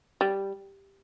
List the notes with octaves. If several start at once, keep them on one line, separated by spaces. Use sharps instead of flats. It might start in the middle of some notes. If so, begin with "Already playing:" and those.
G3